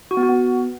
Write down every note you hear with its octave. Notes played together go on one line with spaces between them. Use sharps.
F#4
B3
F#4
B3